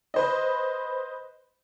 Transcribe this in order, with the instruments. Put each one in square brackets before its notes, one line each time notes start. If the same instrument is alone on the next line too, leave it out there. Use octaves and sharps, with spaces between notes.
[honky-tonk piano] B4 C5 D#5